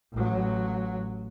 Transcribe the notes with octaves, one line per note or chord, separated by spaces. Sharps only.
A1 F#3